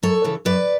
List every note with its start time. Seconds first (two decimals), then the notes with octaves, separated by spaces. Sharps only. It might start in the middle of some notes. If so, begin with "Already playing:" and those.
0.03 F#2 A4 C#5
0.24 C#3 E3
0.45 F#2 B4 D5